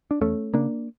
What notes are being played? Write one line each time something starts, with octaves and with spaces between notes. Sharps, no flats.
D4
E2 A3 C#4
C#3 A#3 D4